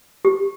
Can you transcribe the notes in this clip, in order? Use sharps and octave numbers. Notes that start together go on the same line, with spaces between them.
G4